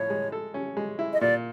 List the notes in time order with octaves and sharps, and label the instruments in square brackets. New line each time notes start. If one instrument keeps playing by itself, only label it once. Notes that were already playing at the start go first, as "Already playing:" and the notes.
Already playing: [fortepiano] A2 F3 [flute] C#5
[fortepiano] G#3
A4
C#4
G#3
E4
[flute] D#5
[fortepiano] A#2 [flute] D5